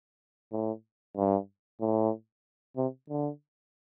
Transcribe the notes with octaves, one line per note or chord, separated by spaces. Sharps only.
A2
G2
A2
C3
D3